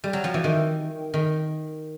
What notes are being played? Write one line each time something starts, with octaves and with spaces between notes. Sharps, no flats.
G3
F#3
F3
E3
D#3
D#3